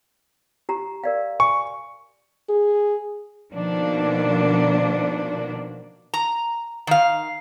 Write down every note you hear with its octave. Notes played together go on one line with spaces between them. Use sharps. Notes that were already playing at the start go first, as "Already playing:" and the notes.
G4 A#5
A#4 D5 F5
G#5 C#6
G#4
B2 D#3 F3 A#3 D4
A#5
D#3 F5